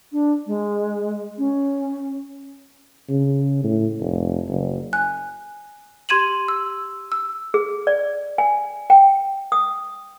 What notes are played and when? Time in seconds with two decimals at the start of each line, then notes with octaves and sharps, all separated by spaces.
0.12 D4
0.47 G#3
1.38 C#4
3.09 C#3
3.64 A2
4.00 F1
4.48 F#1
4.93 G#5 F#6
6.09 G4 C6 G#6 D#7 E7 F#7
6.48 E6
7.12 E6
7.54 G#4
7.87 D5
8.38 G#5
8.90 G5
9.52 D#6